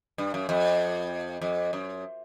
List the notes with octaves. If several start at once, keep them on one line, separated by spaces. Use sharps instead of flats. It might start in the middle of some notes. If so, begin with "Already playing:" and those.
G2
F#2
F2
F2
F#2